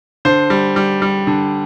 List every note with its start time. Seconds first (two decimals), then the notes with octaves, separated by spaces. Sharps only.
0.25 D3 C5
0.50 G3
0.76 G3
1.02 G3
1.27 D3